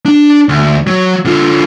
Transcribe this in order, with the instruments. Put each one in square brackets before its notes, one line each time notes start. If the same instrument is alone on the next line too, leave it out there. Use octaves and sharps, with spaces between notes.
[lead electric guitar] D4
D2
F#3
D3 F4